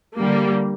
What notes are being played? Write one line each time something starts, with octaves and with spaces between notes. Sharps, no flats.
D3 G3 A#3